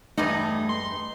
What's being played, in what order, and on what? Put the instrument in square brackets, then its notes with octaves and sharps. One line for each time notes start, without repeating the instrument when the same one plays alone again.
[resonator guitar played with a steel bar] E2 G2 D#4 [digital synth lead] A3
[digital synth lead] C6